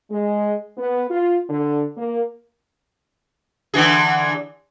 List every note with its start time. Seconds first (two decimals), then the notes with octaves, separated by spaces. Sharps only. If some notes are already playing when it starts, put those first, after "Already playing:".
0.11 G#3
0.78 B3
1.10 F4
1.50 D3
1.97 A#3
3.74 D3 E3 G#4